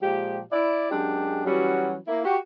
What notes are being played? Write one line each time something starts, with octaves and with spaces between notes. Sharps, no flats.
A#2 F3 G#3 G4
E4 D5
F#2 G#3 D4 G4
E3 F#3 G3 C#4 F#4
A#3 E4
F#4 G4